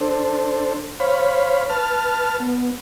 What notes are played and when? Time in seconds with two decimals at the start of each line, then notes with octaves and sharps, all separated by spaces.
0.01 D4 A4 C5
1.00 C5 C#5 F5 B5
1.70 B4 A5 F6
2.40 B3